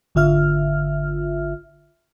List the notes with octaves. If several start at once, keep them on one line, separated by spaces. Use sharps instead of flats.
G#1 D3 F4 E5 F6